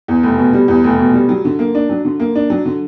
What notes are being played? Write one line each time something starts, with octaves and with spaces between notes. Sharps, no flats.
E2
F1
B2
G3
E2
F1
B2
G3
F#3
D3
A#3
D4
F#3
D3
A#3
D4
F#3
D3